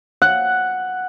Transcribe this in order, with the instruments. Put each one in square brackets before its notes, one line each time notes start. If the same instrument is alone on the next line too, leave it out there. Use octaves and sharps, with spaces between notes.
[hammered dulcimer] F#5